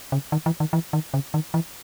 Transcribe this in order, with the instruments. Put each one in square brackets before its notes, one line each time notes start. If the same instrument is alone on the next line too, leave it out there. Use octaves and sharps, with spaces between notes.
[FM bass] C#3
D#3
E3
D#3
E3
D#3
C#3
D#3
E3